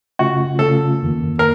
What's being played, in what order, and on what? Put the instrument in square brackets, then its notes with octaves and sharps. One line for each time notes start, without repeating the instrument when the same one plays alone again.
[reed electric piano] C#3 A3 C#4 F4 [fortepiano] F#4
[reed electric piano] C#3 A3 C#4 F4 [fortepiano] A4
[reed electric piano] F2 D#3 A#3
[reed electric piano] A#3 [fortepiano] A#4